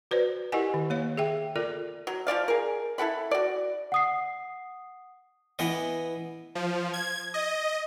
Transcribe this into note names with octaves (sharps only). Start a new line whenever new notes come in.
F#4 B4 C5 D5
E4 G4 A#4 D#5 F#5 G#5
D#3
A#3 C#5 F5
G#4 E5 G5
F4 A4 A#4 D5
F#3
F3 E4 D5 F5
G#4 A#4
E4 A4 F#5 B5
F#4 D5
F#5 D#6 C7
E3 B3 D#5
F3
G#6
D#5